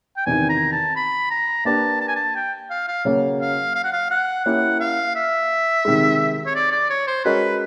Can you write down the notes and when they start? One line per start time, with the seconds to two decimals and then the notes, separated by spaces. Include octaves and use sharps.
0.17 G5
0.26 E2 C3 D#3 G#5
0.49 A#5
0.73 A5
0.96 B5
1.31 A#5
1.65 A#3 D4 G4 B4 A5
2.01 A5
2.08 G#5
2.16 A5
2.36 G5
2.70 F5
2.88 F5
3.05 C#3 F#3 A#3 C#4
3.40 F5
3.75 F5
3.84 F#5
3.93 F5
4.11 F#5
4.45 A#3 C#4 E4 G4 F#5
4.80 F5
5.15 E5
5.85 C3 D#3 G#3
6.47 C#5
6.55 D5
6.72 D5
6.90 C#5
7.07 C5
7.25 G#3 C#4 F#4 A#4 B4 D#5